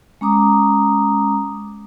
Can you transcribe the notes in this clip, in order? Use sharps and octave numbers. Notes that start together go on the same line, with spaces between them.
G#3 C#4 A#5 D6 D#6